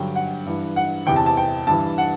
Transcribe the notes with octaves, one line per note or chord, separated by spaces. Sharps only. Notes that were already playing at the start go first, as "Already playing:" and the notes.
Already playing: G2 D3 F#3 G5
F#5
G2 E3
F#5
E2 C3 E3 G5
A5
A5
G5
G2 E3 A5
F#5